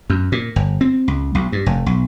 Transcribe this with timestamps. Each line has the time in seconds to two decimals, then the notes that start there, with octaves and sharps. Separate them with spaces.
0.10 F#2
0.32 A#2
0.56 G1
0.81 C4
1.08 C#2
1.35 B1
1.52 G2
1.66 F1
1.86 B1